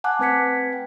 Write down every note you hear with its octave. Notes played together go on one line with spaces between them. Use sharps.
F#5 G#5 A5 D6 F#6
A3 C4 B4 G#6 B6 C#7
G5